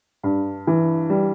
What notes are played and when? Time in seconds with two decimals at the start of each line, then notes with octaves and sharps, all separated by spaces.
0.23 G2
0.67 E3
1.10 G3